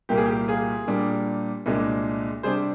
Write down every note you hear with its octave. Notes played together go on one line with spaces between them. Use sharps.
C2 A#2 G3 A#3 G4
G#4
G4
F4 G#4
A#2 G3 A#3 D4
C2 A#2 G#3 D4
C3 G3 D4 G#4 C5